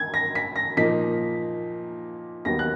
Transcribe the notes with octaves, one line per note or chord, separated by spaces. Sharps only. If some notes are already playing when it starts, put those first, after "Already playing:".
Already playing: D#4 G#6
A#6
B6
A#6
A#2 F3 A#3 D#4 B6
D#2 D#3 F#3 B3 A#6
F#6